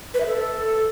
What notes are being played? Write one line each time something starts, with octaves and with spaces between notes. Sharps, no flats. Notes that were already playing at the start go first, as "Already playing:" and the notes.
B4
E5
A4